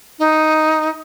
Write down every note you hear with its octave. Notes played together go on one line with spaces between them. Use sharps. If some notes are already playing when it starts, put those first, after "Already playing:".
D#4